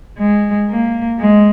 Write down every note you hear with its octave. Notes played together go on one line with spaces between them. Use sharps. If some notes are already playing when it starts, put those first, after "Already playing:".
G#3
A#3
G#3